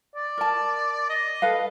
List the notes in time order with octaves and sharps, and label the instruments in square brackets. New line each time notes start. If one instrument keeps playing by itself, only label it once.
[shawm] D5
[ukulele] A#4 A5
[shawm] D#5
[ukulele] A4 B4 F5